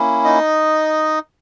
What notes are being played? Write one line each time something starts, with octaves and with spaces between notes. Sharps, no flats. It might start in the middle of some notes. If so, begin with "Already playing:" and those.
Already playing: A#3 C#4 E4
D#4 D#5